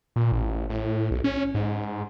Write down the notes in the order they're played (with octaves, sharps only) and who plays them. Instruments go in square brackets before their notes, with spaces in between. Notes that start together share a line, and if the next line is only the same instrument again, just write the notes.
[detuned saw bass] A#2
A1
A2
B1
C#4
G#2